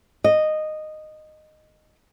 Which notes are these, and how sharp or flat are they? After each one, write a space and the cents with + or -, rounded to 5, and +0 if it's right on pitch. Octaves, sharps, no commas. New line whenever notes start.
D#5 -10